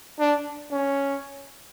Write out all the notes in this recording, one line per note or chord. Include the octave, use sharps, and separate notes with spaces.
D4
C#4